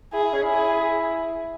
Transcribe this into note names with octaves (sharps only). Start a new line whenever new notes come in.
E4 G#4
E4
C#4
E4
G#4